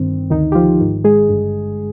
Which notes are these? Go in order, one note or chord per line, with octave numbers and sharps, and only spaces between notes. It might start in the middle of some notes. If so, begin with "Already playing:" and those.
Already playing: G1 G2 D#3 C4
D2 D3 D#3 D#4
G4
F3 F4
G#1 G#2 D#3
G#3 G#4
G#1 G2 D3